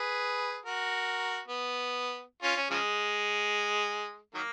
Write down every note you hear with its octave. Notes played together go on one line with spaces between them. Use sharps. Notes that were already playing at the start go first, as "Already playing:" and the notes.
Already playing: G#4 B4
F#4 A#4
B3
C#4 F4
C#4
C#3 F3 G#3
D#3 F#3 A#3